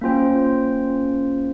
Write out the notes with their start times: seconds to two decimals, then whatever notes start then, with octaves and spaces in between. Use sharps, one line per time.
0.01 A#3 C#4 F4 C5 G5